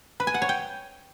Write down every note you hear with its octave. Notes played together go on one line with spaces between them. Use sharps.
B4
G#5
F#5
C#5
G5